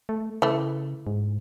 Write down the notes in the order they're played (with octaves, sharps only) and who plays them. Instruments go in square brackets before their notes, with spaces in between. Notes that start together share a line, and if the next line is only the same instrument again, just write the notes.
[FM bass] A3
[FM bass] C#3 [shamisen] E3 A3
[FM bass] G#2